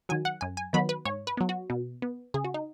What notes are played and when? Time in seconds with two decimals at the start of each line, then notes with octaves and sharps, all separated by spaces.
0.09 D#3 F#3 G#5
0.25 F#5
0.41 F#2 G#5
0.57 G#5
0.73 D#3 F#3 B3 B5
0.89 B4
1.05 G#2 C#5
1.27 B4
1.37 F#3 B3
1.49 F#4
1.70 B2
2.02 B3
2.34 C#3 G#4
2.44 F#4
2.54 D#4